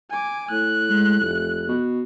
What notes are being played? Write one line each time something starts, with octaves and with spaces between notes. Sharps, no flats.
G#5 D6
A2 F#6
G#3
F1
B2